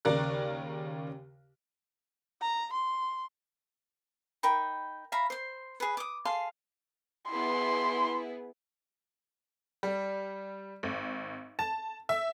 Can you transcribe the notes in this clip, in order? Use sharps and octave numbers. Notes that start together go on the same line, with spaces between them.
D#2 C#3 A#4 D5 F#6
A#5
C6
D#4 A#4 G5 B5
E5 F5 A#5 B5
C5 C6
G#4 B4
D6 D#6
G#4 A4 F5 C6
B3 E4 G#4 C6
G3
G#1
A5
E5